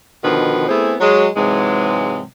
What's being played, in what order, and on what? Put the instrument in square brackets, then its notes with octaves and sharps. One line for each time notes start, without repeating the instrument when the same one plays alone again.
[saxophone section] B2 D3 D#3 F3 F#4 B4
A3 B3 C4 E4 G#4
F#3 G#3 C#5
G#2 C3 E3 F#3 G#3